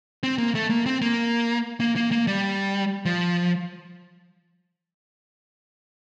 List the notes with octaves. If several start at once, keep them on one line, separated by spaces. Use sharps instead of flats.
C4
A#3
A3
A#3
C4
A#3
A#3
A#3
A#3
G3
F3